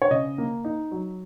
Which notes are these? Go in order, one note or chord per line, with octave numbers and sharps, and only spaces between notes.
C#5
C#3 D#5
A#3
D#4
F#3